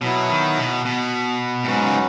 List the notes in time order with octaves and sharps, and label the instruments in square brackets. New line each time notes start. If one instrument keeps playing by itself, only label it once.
[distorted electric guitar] B2 [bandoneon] F#3 B3 E4
[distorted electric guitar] D#3
B2
B2
A2
[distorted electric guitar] G#2 [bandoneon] F#3 C#4 F#4 B4
[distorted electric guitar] C#3